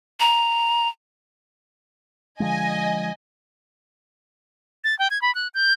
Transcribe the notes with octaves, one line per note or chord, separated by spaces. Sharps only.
A#5
D3 F3 G#3 D#5 G#5
A6
G5
G#6
B5
F#6
G6